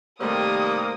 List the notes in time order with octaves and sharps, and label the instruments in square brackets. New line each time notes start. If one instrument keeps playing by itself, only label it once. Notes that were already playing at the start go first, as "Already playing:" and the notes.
[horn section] C3 D#3 G3 [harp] A3 G4 C5 [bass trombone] A#3 [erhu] D#6